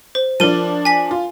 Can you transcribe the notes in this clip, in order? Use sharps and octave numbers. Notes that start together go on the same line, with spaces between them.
C5
F3 D4 A#4 D#7
G#5 B6
F4